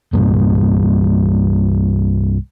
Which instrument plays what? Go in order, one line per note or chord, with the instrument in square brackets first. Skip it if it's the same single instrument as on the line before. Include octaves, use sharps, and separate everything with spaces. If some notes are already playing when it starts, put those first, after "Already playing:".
[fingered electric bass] C2 G2 A#2